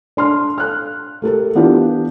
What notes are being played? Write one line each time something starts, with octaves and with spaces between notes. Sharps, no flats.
D4 C6 F6
F6 F#6
A3 G4 A4 A#4
E3 B3 D4 F4 G4